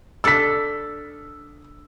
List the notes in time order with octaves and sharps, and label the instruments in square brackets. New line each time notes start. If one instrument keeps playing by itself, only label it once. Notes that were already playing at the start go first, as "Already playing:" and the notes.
[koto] D4 A4 [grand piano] E6 B6